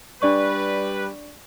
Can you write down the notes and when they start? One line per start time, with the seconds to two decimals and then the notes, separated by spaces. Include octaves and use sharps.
0.22 G3 D4 B4 D5 C#6